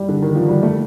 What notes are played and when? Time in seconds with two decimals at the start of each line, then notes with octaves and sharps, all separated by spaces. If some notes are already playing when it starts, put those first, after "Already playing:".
Already playing: G3
0.09 D3
0.22 D#3
0.36 F3
0.49 G3
0.63 A3